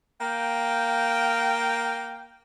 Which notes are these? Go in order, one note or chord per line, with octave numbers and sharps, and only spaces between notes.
A#3 F5 G5